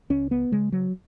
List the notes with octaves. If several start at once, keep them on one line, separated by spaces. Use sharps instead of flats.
C#2 C#4
B3
C#3 G#3
F#3